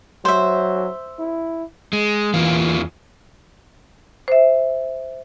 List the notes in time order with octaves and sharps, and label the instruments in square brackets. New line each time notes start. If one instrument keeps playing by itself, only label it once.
[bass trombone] F#3 [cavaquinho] C5 E5
[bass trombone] E4
[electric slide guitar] G#3
[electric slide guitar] E2 A#3 F4 [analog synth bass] E3
[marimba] C5 E5